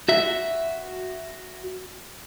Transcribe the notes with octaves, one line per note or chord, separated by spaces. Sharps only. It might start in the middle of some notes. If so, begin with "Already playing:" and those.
F#4 E5